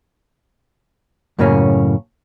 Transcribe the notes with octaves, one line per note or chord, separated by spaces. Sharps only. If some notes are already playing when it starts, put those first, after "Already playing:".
F#2 A2 C#3 A#3 C#4